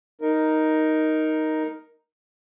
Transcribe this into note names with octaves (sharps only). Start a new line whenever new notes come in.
D#4 A#4